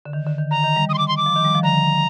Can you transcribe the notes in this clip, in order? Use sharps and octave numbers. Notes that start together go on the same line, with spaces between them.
D3
D#3
D3
D#3
D3 A#5
D#3
G3
D#6
C6
D6
C6
D6
F3
D#3
G3
F3
D3 A#5